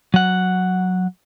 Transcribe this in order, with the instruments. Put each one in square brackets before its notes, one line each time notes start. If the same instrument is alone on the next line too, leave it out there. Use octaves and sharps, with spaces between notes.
[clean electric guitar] F#3 F#5